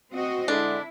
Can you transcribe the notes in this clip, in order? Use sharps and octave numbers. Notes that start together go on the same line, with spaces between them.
C4 F#4 D#5
D3 G#3 D4 E4